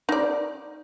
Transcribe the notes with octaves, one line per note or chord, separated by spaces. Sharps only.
D#4 D5